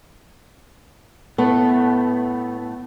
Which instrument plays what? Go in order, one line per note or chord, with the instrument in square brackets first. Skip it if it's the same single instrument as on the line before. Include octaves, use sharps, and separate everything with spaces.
[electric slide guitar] A2 A3 [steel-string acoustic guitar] B3